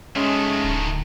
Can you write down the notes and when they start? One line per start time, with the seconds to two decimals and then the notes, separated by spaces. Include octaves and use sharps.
0.16 D#3 G#3 A3 C#4
0.64 D1